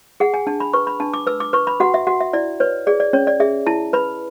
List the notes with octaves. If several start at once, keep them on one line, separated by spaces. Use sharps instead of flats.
G#4 F#5
G#5
D4 A5
B5
B4 C#6
B5
D4 A5
D6
B4 E6
D6
B4 C#6
B5
F#4 F#5
E5
F#4 F#5
E5
E4 D5
B4 C#5
G#4 D5
D5
C#4 C#5
D5
G#4 E5
E4 A5
B4 B5